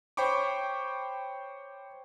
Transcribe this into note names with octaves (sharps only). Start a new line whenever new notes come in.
C5 C#5 G5 B5 C#6 D6